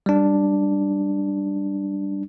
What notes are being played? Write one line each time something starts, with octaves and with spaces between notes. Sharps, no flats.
G3 D4